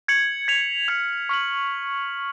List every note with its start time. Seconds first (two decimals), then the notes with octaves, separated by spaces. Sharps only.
0.08 G#6 C#7 F#7
0.48 G#6 B6 F7
0.88 F6 G#6 C#7 F7
1.29 C#6 F6 B6 F#7